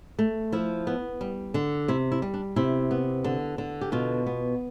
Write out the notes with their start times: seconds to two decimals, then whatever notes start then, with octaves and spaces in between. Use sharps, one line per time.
0.19 A3
0.52 F3 E4
0.87 B3
1.21 G3
1.54 D3
1.88 C3 E4
2.12 E4
2.22 G3
2.34 D4
2.56 C3 E4
2.91 B3
3.24 D3
3.58 D3
3.81 G4
3.92 B2 F4
4.26 B3